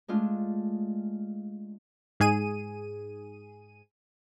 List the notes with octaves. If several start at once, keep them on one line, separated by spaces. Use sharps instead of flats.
G#3 A3 D4 F4
G#2 G#4 D#7